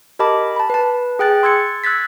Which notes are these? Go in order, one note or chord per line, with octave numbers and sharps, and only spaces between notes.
G4 A#4 D#5 A5 B5 D6
A5 B5
B4 A5
G#4 G5 F#6 A6
C6 E6 G#6 A6 C#7
E6 F#6 G#6 A6 B6